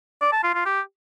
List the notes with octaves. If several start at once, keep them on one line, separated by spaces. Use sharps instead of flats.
D5
A5
F4
F4
G4